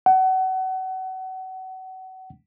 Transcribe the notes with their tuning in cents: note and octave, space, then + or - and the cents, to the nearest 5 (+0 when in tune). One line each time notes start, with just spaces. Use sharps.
F#5 +30